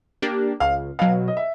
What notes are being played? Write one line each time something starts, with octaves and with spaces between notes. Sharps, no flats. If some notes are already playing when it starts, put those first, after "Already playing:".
A#3 D4 G4
C#2 F5
B2 F#3 F5
D#5
E5